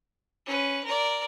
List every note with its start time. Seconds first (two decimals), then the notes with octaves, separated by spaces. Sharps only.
0.46 C#4 B4
0.85 A#4 D5